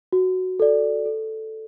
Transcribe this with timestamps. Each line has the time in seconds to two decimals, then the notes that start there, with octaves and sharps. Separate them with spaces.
0.12 F#4
0.60 A4 D5
1.06 A4